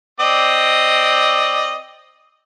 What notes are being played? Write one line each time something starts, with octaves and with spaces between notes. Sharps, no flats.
C4 D5 D#5